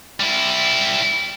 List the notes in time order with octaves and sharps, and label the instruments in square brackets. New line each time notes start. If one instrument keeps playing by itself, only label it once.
[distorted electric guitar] G3 E4